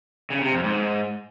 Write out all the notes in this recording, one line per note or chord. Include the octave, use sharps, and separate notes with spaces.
C#3
C3
F2
G#2